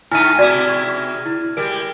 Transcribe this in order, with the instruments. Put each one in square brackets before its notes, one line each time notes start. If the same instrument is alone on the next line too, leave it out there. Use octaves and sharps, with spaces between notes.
[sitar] G#2 A3 D#4 [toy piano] E4 [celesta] G#5 [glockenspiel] F6 D#7
[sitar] B2 G#3 E4 [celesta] F#4 [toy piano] D5 [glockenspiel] G#6 A6
[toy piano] C#6
[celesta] E4
[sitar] G3 G#3 [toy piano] A#4 [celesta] D7